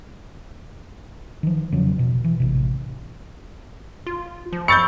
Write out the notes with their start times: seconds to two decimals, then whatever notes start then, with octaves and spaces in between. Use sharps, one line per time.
1.43 D#3 F3
1.72 E2 C#3 F3 F#3
1.99 B2
2.24 E3
2.40 A1 C3
4.07 F4
4.53 F3
4.68 B5 C#6 E6 G6 A6 C#7